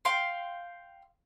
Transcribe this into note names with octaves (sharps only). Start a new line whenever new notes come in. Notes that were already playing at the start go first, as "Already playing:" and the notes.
F5 G5 C6